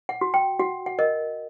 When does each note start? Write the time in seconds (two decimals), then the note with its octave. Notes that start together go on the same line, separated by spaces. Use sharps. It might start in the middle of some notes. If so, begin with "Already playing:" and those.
0.09 F#5
0.21 F#4
0.34 G5
0.60 F#4 F#5
0.86 F#5
0.99 A#4 D#5